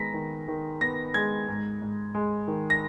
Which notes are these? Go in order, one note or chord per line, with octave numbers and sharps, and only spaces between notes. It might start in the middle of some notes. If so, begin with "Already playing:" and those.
Already playing: D#3 G#3 B3 A#5 A#6 B6
D#3
D#3
B3 A#6
G#3 G#6
G#2
G#2
G#3
D#3
A#6